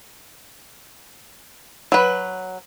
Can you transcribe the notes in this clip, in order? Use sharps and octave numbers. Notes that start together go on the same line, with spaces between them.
F#3 B4